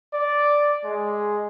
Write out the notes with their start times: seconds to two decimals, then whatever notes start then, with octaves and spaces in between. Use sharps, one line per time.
0.13 D5
0.85 G#3